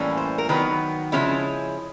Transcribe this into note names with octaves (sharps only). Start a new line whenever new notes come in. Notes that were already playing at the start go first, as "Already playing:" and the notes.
Already playing: A2 E3 G3 A#3 C#4
C5
A#4
D#3 F#3 B3 B4
C#3 F3 G#3 C#4 E4